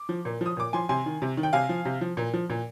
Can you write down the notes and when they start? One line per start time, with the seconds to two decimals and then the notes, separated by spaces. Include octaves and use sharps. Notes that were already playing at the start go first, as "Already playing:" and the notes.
Already playing: D6
0.09 F3
0.25 A#2
0.41 F3 D#6
0.57 A#2 D6
0.73 F3 G#5 C6
0.89 C3 G#5 C6
1.06 D#3
1.22 C3
1.37 D#3
1.43 G5
1.53 C3 F5 G#5
1.69 F3
1.85 C3
2.01 F3
2.17 A#2
2.33 F3
2.50 A#2